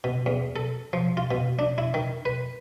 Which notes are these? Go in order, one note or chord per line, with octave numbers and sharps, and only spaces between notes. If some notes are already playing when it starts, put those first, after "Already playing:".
B2
E2
A4
F3
F4
B2
D4
E4
D#3
B4